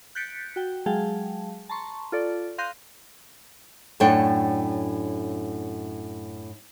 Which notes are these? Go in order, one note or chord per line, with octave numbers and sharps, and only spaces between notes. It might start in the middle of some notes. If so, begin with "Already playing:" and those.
F#6 G6 A6 B6 C#7 D7
F#4 G5
F#3 G#3 G#4 F5 G5 A5
A5 A#5 C6 C#6
F4 A4 D5
F5 C6 F#6 G6 A#6 D#7
F#2 A2 D4 C#5 G5